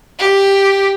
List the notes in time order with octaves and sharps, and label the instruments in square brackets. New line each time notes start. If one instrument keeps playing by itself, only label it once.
[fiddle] G4